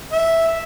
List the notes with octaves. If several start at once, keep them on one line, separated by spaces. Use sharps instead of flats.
E5